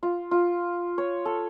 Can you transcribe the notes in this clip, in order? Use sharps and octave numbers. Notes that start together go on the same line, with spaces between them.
F4
F4
C#5
A4